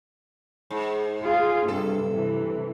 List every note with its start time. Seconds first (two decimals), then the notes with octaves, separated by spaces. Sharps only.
0.70 G#2
1.24 F4 G#4
1.68 G2 C3 A4
2.10 C3 E3